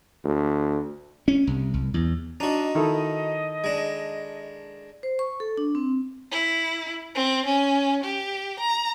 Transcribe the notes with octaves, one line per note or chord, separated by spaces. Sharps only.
D2
C#4
C2
C2
E2
D4 D#4 F#4 D#5
D#3 E4 A4
G#3 D4
C5
C#6
A4
D4
C4
E4
C4
C#4
G4
A#5